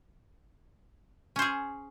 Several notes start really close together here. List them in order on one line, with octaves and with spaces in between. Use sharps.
C#4 C5 G#4